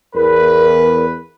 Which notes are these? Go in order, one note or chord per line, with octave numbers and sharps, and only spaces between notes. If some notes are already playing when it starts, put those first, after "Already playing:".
E2 A#4 B4